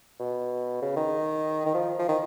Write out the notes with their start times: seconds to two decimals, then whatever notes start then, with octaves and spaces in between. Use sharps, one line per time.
0.19 B2
0.82 C#3
0.97 D#3
1.66 D#3
1.74 F3
1.99 F3
2.08 D#3